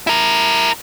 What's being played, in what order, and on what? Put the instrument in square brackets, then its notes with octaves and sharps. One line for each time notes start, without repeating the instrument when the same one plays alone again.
[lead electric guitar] E4 A#4